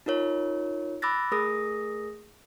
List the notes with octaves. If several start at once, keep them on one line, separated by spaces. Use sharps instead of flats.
D#4 F4 A#4 C#5
B5 D6 E6 F#6 A6 A#6
A3 G#4 A#4 D#6 A#6